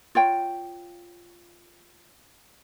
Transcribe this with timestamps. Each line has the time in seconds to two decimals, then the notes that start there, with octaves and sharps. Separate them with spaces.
0.15 F4 C#5 G5